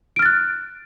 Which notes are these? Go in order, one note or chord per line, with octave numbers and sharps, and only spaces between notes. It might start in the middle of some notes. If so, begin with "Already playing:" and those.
F6 F#6 A6 D7